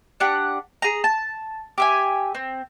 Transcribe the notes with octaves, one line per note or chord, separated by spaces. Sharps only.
D4 G4 F#5
G#4 A#5
A5
G4 E5 G#5
C4